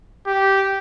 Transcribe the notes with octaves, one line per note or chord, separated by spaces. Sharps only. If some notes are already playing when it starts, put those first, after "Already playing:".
G4